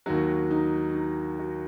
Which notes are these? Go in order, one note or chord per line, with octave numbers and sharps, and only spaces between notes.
D#2 D#3 F#3 F#4
D#4
D#4
F#4